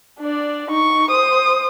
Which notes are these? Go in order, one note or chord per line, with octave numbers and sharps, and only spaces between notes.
D4 D5
D#4 C#6
C5 D#6